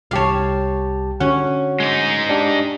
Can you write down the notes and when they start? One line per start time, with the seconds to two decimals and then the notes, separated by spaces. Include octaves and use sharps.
0.11 C2 G4 C#5 F5 A5
1.20 D3 C#4 F#4 F#5
1.80 G#3 D#4
2.29 D4 G4